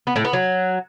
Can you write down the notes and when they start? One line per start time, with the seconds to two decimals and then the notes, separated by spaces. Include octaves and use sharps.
0.07 B3
0.16 A2
0.24 B3
0.33 F#3